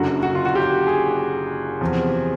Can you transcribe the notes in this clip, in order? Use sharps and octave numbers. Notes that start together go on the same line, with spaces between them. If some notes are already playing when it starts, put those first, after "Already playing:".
Already playing: F#1 F#2 D3 F#3 F#4
F#4
F4
F#4
G4
G#4
E2 C3 F3